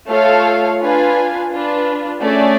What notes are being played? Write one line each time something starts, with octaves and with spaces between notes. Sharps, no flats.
A3 F4 A4 C#5 F5
D4 F4 B4 F5 G#5
D4 F4 B4
A3 C#4 G#4 D5